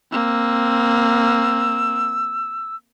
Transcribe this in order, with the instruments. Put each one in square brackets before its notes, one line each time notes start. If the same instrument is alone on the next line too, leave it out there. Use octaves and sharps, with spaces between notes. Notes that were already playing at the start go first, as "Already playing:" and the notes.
[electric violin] A#3 C4 [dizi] E6